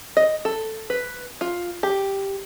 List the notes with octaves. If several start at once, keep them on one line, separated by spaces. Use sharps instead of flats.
D#5
A4
B4
F4
G4